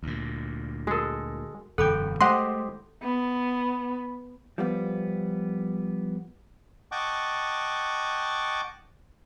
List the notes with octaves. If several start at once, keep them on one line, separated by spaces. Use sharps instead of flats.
D2 A#2
G#3 F#4 A4 A#4
E1 F#2 D3 A4 F#5 G5 B5 D6
G#3 A3 G4 C5 D#5 F#5 C6
B3
F3 G3 B3
D#5 F#5 G5 A5 C#6 D6